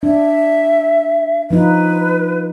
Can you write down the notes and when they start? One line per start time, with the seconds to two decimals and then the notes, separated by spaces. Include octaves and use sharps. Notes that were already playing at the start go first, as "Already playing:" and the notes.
0.03 D4 E5
1.51 F3 D#4 F4 B4